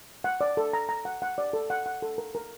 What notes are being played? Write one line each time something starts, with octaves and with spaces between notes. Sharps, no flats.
F#5
D5
A4
A#5
A#5
F#5
F#5
D5
A4
F#5
F#5
A4
A#4
A#4